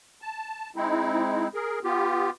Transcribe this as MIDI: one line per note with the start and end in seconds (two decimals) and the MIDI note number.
0.22 0.70 81
0.76 1.48 56
0.76 1.48 60
0.76 1.48 63
0.76 1.48 64
1.54 1.79 68
1.54 1.79 70
1.84 2.30 59
1.84 2.30 65
1.84 2.30 67